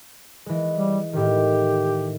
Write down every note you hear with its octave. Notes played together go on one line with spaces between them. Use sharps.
E3 G#3
G3
A2 D#3 G4